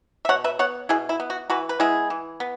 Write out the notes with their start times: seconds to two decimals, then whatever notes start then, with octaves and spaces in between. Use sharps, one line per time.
0.25 E5
0.29 B2 C#5 F#5
0.44 B4 E5
0.59 B3 C#5 F#5
0.89 B2 E4 G#4
1.09 E4
1.20 B3
1.30 F#4
1.50 E3 F#4 B4
1.69 B4
1.80 G#3 B3 E4 G#4
2.10 E3
2.40 B3